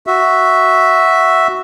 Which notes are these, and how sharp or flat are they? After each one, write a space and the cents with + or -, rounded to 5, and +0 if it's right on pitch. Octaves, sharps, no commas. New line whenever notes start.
F#4 +0 E5 -5